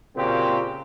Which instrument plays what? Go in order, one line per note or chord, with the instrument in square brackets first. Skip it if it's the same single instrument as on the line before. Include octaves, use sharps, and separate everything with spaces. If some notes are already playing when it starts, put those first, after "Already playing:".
[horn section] A#2 C#3 A#3 C4 F#4 G4